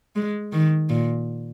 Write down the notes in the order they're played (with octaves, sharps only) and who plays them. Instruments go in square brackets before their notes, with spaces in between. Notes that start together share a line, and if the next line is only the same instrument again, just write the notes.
[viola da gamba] G#3
D#3
A#2